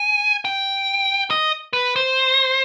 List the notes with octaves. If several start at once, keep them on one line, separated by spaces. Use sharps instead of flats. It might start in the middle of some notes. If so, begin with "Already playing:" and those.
Already playing: G#5
G5
D#5
B4
C5